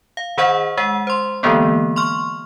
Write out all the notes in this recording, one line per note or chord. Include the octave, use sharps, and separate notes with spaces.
F5
D#3 G#4 C5 D#5 F#5
G#3 F#5
C5 C6
D3 E3 G#3 A#3 B3
C6 C#6 F6